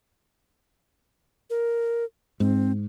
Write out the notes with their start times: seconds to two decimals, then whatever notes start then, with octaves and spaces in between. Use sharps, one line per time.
1.50 A#4
2.40 G#2 C4